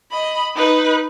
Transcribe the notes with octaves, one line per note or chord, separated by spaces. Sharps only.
D#5 B5
D#4 B4